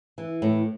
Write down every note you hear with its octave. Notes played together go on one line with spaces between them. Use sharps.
E3
A2